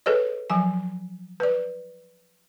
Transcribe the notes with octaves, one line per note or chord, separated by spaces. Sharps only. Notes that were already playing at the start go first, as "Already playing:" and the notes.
G#4 A4 B4 C#5 D#5
F3 F#3 G#5
B4 D5